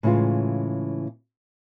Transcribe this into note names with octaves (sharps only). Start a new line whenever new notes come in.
A2 C#3 E3 G#3 F4